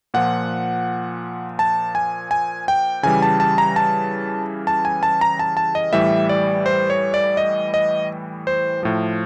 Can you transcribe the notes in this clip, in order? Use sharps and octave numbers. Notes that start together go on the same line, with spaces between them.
A#2 F3 F#5
A5
G#5
G#5
G5
C#3 E3 G3 G#5
A5
A5
A#5
A5
A5
G#5
A5
A#5
A5
A5
D#5
A2 E3 G3 E5
D5
C5
C#5
D5
D#5
D#5
C5
A2 F3